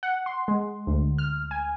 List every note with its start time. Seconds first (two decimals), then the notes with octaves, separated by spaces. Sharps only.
0.03 F#5
0.26 C6
0.48 G#3
0.87 D2
1.18 F6
1.51 G#5